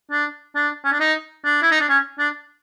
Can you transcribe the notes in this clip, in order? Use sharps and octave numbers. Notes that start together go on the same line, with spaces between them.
D4
D4
C#4
D4
D#4
D4
E4
D#4
D4
C#4
D4